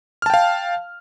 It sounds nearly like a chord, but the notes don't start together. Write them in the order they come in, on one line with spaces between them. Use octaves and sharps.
F6 A5 G5 F5